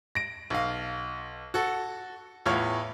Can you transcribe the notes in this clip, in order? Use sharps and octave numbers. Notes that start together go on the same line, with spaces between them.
A#6 D7
B1 F5
F#4 A4
E2 A2 F4 C#5 F6